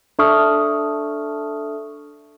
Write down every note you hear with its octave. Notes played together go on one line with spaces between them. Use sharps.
D4 A4 E5 C#6 D#6 F6